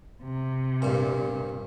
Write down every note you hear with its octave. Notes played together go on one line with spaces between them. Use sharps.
C3
G2 A#2